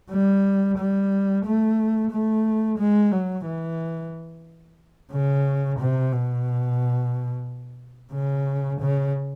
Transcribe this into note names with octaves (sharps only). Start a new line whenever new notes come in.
G3
G3
A3
A3
G#3
F#3
E3
C#3
C3
B2
C#3
C#3